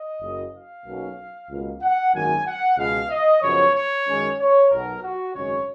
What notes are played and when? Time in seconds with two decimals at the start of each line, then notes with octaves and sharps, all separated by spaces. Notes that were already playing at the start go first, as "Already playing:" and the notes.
Already playing: D#5
0.21 F#1 F#2 C#3
0.54 F5
0.86 B1 B2 F#3 A#3 C#4
1.49 C#2 B2 A#3
1.82 F#5
2.13 G#1 F#2 D#3 F#3 A#3 G#5
2.46 F#5
2.78 C#2 B2 G#3 F5
3.10 D#5
3.42 F#2 C#3 F3 B3 C#5
3.75 C#5
4.07 F#2 D#3 G#3 C#4
4.39 C#5
4.71 B1 B2 F#3 A#4
5.03 F#4
5.35 G#1 F#2 C#3 G#3 C#4 C#5